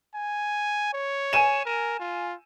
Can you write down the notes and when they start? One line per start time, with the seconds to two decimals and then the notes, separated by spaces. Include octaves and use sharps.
0.15 G#5
0.93 C#5
1.33 G#5 D#7 E7
1.65 A#4
1.99 F4